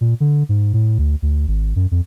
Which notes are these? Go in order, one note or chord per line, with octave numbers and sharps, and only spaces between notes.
A#2
D3
G#2
A2
D2
D2
G#1
F#2
F2